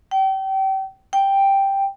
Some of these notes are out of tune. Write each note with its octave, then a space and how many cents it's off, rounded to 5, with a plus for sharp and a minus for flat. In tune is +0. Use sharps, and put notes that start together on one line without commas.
G5 -30
G5 +0